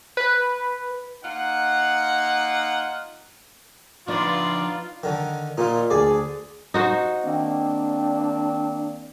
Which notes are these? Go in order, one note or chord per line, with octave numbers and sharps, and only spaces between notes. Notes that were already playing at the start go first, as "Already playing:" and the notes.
B4
A#3 D#4 F4 F#5
F3 B3 D4 D#4 F4 B4 D5
D3 D#3
A#2 D#4 F4
D2 G#4 D5
D#4 F#4 C5
D#3 A#3 C4 D4